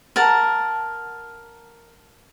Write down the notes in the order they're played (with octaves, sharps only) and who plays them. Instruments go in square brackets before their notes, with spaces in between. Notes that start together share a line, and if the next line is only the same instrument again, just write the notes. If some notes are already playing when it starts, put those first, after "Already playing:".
[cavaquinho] A#4 F#5 A5